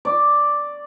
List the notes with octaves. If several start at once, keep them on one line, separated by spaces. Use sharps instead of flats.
D5